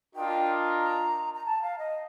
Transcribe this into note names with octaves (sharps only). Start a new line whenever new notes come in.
D4 F4 A#4 D#5 G5
A#5
A#5
A5
F5
D#5